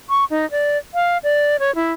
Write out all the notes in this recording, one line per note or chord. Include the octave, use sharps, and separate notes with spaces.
C#6
D#4
D5
F5
D5
C#5
E4